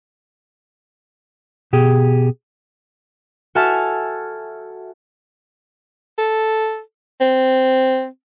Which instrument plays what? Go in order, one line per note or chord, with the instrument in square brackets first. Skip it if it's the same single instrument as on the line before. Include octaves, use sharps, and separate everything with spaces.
[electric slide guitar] B2 G4 G#4
[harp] F#4 A4 E5 G#5 A5 F6
[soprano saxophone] A4
C4